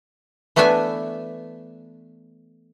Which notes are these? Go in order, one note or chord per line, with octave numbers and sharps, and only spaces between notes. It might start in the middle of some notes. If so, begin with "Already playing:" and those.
E3 A3 B3 D4 E5 G#5